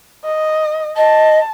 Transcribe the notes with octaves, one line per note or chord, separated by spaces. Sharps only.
D#5
D#5 A5